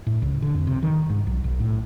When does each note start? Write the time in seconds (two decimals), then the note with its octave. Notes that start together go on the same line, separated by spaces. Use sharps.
0.07 A2
0.22 C#2
0.42 D3
0.54 F2
0.67 C3
0.83 D#3
1.10 G#2
1.27 B1
1.44 B1
1.60 A2